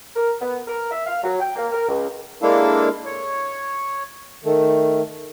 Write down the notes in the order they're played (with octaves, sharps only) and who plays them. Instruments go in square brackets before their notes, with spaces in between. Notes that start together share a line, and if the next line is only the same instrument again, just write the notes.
[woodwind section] A#4
B3
A#4
E5
F5
F#3
G5
A#3
A#4
C#2
[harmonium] G#3 A#3 D4 E4 A4 F5
C#5
D#3 A3